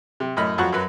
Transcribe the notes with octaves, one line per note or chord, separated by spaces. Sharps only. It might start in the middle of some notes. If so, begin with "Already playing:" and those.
C3
F#2 A2 D#5 B5 F6
F2 F3 F#3 F#5 C#6 F#6
F#2 F#3 F#4 B4